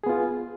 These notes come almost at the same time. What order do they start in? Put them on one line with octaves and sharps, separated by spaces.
G#4 B3 F4